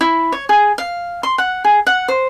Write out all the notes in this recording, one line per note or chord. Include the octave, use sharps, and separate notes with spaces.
E4
C#5
G#4
F5
C6
F#5
G#4
F#5
C5